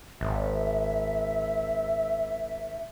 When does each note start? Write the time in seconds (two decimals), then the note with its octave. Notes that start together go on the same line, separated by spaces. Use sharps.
0.21 G#1 E5